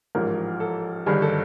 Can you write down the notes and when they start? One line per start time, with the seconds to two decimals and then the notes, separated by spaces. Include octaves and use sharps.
0.15 A1 G#2 F3 A#4
0.60 A4
1.06 G1 G2 D#3 G3 G#4
1.22 A4